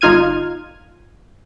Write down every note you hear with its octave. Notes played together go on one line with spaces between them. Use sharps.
G1 D#4 F4 F6 G#6 D#7